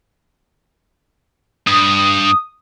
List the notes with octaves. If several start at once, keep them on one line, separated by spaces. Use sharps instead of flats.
G2 D#6